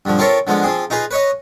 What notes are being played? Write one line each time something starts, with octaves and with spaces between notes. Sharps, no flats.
G2 D3 F3
C4 F4 A4 A#4 C#5 E5
D3 F3 G#3 B3
F3 C4 G#4
D#4 F4 G#4 B4
B4 C#5 D#5